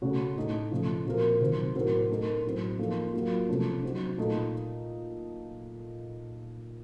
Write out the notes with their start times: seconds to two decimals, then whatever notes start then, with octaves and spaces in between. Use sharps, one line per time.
0.02 C#3 A3 C#4 F#4
0.36 A2 A3 D#4 A4
0.71 C#3 F3 A3
1.05 A#2 F3 C4 F#4 A#4
1.40 C3 D#3 F#3 C4
1.75 A2 F#3 C4 F#4 A#4
2.10 A3 D#4 A#4
2.45 A2 F#3 C4
2.79 F3 A#3 D#4 A4
3.14 F#3 A#3 F4
3.49 C3 F3 A3 C#4
3.83 F#3 C4 D#4
4.18 A#2 A3 D#4 A4